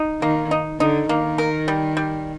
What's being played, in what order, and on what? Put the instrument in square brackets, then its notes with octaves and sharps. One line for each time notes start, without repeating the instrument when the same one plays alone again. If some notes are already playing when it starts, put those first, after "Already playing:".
Already playing: [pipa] D#4
[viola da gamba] D#3 [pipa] A#3
[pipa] D#4
[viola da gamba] D3 [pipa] D#4
[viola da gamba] D#3 [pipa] A#3
[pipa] A#4
G3
G3